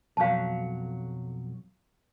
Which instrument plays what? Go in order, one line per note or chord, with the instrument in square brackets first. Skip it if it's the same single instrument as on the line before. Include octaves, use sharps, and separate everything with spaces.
[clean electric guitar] B1 F2 F#3 [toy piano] F5 A5